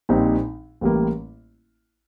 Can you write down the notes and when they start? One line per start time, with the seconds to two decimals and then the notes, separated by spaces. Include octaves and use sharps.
0.09 A#1 A#2 G3 C4 D#4
0.81 A1 A2 G3 A#3